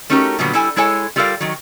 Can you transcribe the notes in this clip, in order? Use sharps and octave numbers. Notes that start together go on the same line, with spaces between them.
A3 C#4 D#4 F#4 G4 A#4
A#2 D3 F#3 G3 B3
G3 E4 A4 G#5
G#3 E4 A4 C#5 G#5
G3 F4 A4 A#4 D5 F5
D#3 F#3